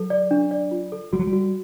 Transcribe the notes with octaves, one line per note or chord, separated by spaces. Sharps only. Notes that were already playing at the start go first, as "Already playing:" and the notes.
Already playing: F#3 A4
D5
D4
D5
F4
A4
G3 F#4
F#3
G3
F#4